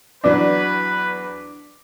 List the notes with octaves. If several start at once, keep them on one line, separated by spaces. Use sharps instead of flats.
E2 F#3 D4 B4